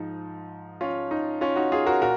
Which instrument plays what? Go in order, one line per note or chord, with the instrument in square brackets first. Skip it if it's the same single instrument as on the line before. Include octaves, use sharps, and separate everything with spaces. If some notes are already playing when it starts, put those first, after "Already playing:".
Already playing: [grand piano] G#2 F3 D#4
C#4 F4
D#4
C#4 F4
D#4 F#4
F4 G#4
F#4 A#4
A#2 F#4 A#4